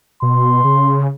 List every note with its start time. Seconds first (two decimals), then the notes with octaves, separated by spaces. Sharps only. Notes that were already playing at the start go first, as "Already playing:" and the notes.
0.22 B2 C6
0.64 C#3